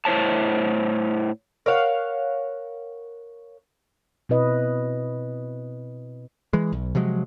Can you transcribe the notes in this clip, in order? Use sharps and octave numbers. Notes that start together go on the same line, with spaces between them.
A2 E4 C5 C#5 A5
A#4 C#5 F5 F#5
B2 C4 E4 B4 D#5
E3 G#3
B1
C3 F3 F#3 G#3